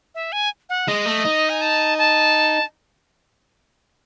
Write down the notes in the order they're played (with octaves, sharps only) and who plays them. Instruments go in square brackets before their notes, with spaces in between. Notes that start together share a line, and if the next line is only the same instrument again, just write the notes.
[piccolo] E5
G#5
F#5
[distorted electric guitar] G#3 [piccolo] D#5
[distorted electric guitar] A3
D#4
[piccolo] G#5
A5
A5